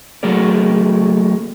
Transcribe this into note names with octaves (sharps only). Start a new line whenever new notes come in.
F#3 A3 A#3 F#4 G#4 D5